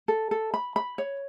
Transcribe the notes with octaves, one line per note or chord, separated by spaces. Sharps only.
A4
A4
B5
B5
C#5